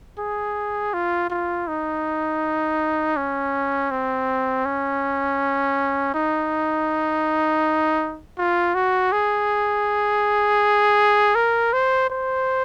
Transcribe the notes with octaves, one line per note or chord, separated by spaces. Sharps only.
G#4
F4
F4
D#4
C#4
C4
C#4
D#4
F4
F#4
G#4
A#4
C5
C5